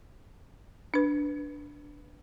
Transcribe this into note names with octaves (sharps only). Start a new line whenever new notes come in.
D4 B4